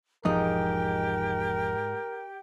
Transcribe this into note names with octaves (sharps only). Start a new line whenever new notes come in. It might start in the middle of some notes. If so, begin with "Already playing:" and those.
E1 E2 G#2 F3 D#4 G4 A#4 G5